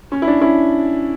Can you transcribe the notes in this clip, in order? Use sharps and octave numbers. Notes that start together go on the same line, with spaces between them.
C#4
E4
D4
C#4 E4